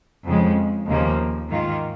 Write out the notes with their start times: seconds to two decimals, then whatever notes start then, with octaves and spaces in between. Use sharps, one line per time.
0.25 F2 C#3 G#3
0.87 D#2 C#3 F3 A#3
1.49 G#2 D#3 A#3 F4